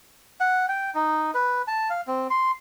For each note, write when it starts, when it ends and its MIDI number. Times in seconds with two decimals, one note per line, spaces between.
0.41 0.66 78
0.69 0.91 79
0.95 1.31 63
1.35 1.62 71
1.68 1.89 81
1.90 2.01 77
2.08 2.27 60
2.30 2.51 84